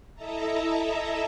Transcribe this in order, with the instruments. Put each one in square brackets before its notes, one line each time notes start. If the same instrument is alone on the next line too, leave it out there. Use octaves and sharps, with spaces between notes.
[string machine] E4 A4 D#5 E5 A5 A#5